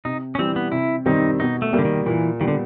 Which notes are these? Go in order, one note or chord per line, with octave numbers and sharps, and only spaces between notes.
C3 D#4
C#4
E3 G3 C4
B3
C3 E4
D#3 G3 C4 D#4
B2 D#4
A3
G3 A#3
D3
D#3
A#2 E3
D#3 G3 B3
D3